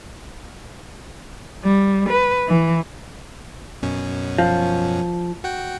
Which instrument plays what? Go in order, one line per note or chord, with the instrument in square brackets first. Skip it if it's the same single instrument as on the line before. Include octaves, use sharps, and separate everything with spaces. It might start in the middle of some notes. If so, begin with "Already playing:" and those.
[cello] G3
B4
E3
[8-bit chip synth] F#2 B2 C#4
[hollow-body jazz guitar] F3
[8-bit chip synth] F#4 F#5 G5